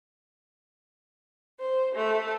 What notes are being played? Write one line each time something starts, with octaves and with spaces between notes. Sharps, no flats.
C5
A3